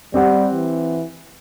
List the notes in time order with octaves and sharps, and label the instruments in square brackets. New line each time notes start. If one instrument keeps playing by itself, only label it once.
[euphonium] G3 [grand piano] C4 G4 F#5
[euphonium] E3